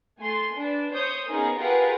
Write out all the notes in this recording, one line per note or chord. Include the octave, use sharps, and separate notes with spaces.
A3 G#5 C6
D4 B4
C5 C#5 D#6 G6
B3 C#4 D#4 G#4 A#4
F4 G4 G#4 A#4 B4 F#5